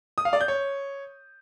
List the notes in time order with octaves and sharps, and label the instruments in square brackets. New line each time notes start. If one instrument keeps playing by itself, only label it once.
[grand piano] D#6
F5
D5
G6
C#5